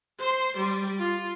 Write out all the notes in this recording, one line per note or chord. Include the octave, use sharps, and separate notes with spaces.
C5 C6
G3
F4